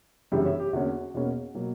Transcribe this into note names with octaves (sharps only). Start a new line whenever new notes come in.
G1 F#2 C#3 E3 G3 E5 G5
C#5 E5
G4
E2 D3 A#3 C#4 F#4
E2 B2 A#3 C#4
B2 F#3 A#3